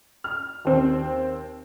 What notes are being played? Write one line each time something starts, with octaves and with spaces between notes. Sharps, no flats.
F6
D#2 C4 C5